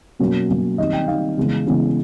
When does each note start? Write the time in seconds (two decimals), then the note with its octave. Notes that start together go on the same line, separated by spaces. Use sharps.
0.19 B2 F#3 A#3 C#4
0.49 B2 F#3 A#3 C#4
0.78 D#3 G3 C4 D#4 D#5
0.93 G5
1.07 D#3 G3 C4 D#4 F5
1.37 C#3 E3 G#3 B3
1.67 C#3 E3 G#3 B3